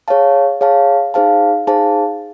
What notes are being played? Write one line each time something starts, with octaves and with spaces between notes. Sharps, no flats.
G#4 C#5 F5 A5
G#4 C#5 F5 A5
D#4 G#4 C5 F5 A5
D#4 G#4 C5 F5 A5